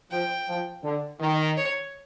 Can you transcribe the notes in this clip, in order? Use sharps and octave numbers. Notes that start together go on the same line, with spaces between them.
F3 G5
F3
D3
D#3
C#5